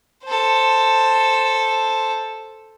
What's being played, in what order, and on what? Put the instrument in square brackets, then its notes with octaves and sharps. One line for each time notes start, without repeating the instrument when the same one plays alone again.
[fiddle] A4 C5